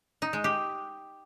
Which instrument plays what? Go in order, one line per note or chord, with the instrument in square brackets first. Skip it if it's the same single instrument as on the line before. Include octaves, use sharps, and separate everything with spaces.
[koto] D#4
G#3
G4